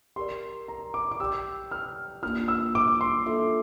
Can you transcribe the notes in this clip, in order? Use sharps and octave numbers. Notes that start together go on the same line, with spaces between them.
G4 A#4 D5 C6
A#5
D6
D6
G4 D5 G5 E6
F6
A#3 D4 F4 F6
E6
D6
C6
A#3 D4 F4 A4 E5